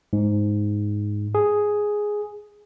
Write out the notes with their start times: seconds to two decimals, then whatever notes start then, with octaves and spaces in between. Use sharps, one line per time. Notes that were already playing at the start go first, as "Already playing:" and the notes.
0.13 G#2
1.35 G#4